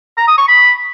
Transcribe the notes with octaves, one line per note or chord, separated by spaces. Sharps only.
A#5
D#6
C#6
B5